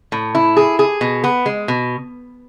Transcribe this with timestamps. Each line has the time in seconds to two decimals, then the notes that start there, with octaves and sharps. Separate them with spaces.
0.12 A2
0.35 E4
0.57 G#4
0.79 G#4
1.01 B2
1.24 B3
1.46 G#3
1.68 B2